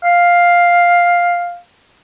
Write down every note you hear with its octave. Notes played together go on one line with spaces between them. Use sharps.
F5